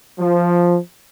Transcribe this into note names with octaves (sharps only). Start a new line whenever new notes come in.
F3